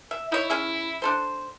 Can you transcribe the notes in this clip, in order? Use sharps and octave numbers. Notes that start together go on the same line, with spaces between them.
E5
D#4 E4 C#5
C#4 G#4 E5
D4 A4 C5